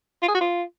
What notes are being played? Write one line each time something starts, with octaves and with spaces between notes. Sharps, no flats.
F4
G#4
F#4
F4